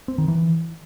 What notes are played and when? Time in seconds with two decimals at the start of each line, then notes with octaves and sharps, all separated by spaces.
0.08 C4
0.18 D#3
0.28 E3